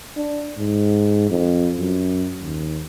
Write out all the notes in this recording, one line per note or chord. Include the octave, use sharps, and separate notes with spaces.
D4
G#2
F2
F#2
D#2